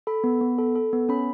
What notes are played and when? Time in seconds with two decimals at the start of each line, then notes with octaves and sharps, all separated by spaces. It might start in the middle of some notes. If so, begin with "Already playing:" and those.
0.07 A4 B5
0.24 B3
0.41 B3
0.58 A4
0.76 A4
0.93 B3
1.09 C#4 B5